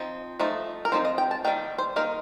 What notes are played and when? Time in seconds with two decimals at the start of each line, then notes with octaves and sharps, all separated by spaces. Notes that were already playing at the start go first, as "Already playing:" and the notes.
Already playing: F3 C4 D#4
0.39 F3 A3 D#4
0.85 A#4
0.92 F3 C4 D#4 C5
1.05 D#5
1.18 G5
1.31 A5
1.44 D#3 G3 A#3 D#4 G5
1.78 C5
1.96 D#3 A#3 D#4 A#4